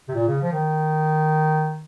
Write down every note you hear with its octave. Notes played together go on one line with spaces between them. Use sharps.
C3
A#2
C#3
F3
D#3